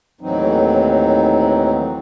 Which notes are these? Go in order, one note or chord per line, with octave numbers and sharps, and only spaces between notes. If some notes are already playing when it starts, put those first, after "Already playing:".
D#2 A2 E3 F#3 C4 D#4